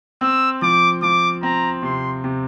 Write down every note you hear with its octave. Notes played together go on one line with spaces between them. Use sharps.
C4 E6
F3 D6
F3 D6
C4 A#5
C3 C6
C3